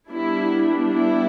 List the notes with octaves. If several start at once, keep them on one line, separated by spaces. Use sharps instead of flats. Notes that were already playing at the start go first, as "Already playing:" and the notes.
G3 B3 D4 E4
E4